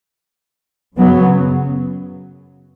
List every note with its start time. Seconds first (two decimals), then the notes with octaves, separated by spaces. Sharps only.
0.98 F#2 C#3 F#3 B3